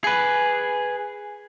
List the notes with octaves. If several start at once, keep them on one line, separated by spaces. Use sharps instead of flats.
G#4 B4